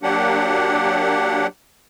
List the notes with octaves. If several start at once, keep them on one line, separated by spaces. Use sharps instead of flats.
F#3 A#3 D4 G4 F#5